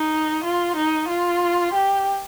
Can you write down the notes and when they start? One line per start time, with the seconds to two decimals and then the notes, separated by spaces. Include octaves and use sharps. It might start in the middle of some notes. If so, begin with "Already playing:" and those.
Already playing: D#4
0.44 F4
0.76 D#4
1.09 F4
1.74 G4